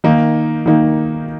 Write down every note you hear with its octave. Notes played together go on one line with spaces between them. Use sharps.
D#3 A#3 D#4
D#3 A#3 D#4